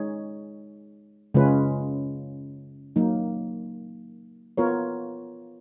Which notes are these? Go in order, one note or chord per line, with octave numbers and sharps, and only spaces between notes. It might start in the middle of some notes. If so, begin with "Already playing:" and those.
Already playing: G#3 D#4 G#4 C#5
C#3 G#3 C#4 F4 B4
F#3 A#3 D#4
B3 F4 A#4 C#5